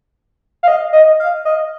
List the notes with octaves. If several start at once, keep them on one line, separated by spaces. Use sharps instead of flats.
F5
D#5
D#5
F5
D#5